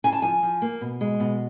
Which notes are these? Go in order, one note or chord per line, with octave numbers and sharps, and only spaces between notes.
C#3 G#5
A5
F3 G#5
F3
A#3
B2
G#3
B2